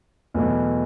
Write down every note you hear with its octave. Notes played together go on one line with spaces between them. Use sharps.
E2 B2 F#3 A3